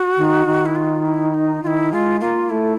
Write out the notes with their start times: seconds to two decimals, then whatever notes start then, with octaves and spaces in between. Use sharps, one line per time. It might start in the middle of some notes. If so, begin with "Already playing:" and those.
Already playing: F#4
0.17 D#3
0.46 D#3
0.66 E4
0.76 F4
1.05 E4
1.34 D#4
1.63 D#3 E4 F4
1.92 G#3 F4
2.21 A#3 F4
2.50 A3 E4